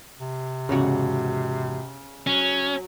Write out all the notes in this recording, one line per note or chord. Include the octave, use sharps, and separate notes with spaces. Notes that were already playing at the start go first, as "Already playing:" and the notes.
C3
E2 G#2 C#3 F#4
F#3 C#4